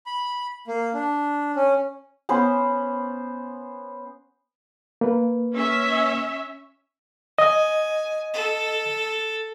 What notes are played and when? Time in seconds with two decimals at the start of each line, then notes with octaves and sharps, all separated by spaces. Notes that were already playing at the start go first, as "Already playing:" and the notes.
0.06 B5
0.67 A#3
0.94 D4
1.56 C#4
2.29 B3 C#4 C5
5.01 A#3 B4
5.54 C#4 E5
7.38 D#5 G#5
8.34 A4